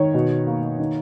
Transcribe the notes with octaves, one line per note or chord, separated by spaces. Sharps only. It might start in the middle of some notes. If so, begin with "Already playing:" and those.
Already playing: D#3 C#5
B2
A#3
D#3